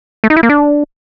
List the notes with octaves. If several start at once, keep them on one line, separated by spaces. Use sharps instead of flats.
A3
D#4
E4
A#3
D4